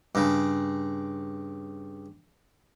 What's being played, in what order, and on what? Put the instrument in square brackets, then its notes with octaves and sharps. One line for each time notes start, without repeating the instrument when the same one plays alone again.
[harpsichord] G2 C#3